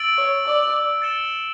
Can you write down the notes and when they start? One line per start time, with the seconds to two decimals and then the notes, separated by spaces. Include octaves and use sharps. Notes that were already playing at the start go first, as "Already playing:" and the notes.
Already playing: E6 A6 D7 F#7
0.18 C#5
0.46 D5
1.02 A6 C#7 E7 G7